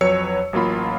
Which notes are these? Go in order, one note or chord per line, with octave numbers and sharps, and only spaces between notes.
F2 F#3 B4 C#5 E6 C#7
A1 F#3 A#3 F4 B5